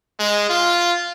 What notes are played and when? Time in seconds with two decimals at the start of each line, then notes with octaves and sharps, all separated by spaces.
0.19 G#3
0.49 F4